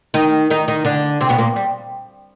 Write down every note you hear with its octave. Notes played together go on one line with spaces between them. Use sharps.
D#3 D#4
D#3 D#4
D#3 D#4
D3 D4
C3 C4
B2 B3
A#2 A#3
G3